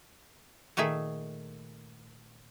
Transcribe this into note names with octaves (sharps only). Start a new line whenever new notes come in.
A#2 D#3 A3 G#4 E5